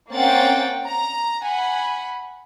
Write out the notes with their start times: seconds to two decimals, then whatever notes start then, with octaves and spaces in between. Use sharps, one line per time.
0.12 A#3 C4 C#4 F#5 G5 A6
0.87 A#5
1.43 F#5 G#5 B5